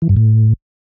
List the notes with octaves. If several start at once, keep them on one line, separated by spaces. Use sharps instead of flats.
E3
G2
A2